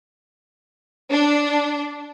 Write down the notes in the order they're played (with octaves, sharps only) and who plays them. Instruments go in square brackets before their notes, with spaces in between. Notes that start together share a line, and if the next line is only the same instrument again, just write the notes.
[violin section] D4